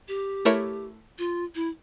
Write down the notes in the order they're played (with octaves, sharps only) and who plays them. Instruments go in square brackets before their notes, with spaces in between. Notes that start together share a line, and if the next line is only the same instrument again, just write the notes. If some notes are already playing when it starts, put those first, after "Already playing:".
[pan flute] G4
[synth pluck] A3 E4 A#4 C#5
[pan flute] F4
E4